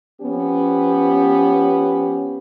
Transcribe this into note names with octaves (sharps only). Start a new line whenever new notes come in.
F3 B3 C#4 G4